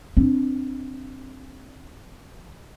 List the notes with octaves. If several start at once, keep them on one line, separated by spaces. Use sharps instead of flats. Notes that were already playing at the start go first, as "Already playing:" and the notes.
C4 D4